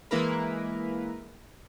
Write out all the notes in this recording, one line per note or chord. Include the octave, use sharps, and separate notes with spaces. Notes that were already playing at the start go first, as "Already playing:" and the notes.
E3 G#3 A#3 E4 A#4 B4